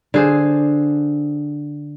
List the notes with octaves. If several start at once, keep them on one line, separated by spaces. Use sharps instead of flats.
D3 G#4 C5